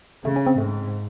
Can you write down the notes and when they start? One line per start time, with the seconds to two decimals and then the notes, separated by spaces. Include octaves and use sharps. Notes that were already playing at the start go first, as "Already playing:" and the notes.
0.25 C#3 A3
0.36 C#4
0.46 C4
0.58 G#2 A3